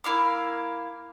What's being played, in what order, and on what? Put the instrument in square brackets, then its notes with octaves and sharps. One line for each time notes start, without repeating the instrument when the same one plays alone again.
[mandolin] A#3 E4 F5 D6